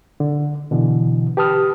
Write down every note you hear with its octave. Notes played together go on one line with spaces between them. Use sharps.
D3
B2 D3 E3
G4 B4 A5 D#6 F6